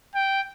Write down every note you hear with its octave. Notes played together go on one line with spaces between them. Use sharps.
G5